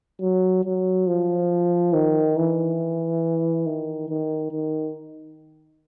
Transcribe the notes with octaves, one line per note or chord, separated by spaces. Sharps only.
F#3
F#3
F3
D#3
E3
D#3
D#3
D#3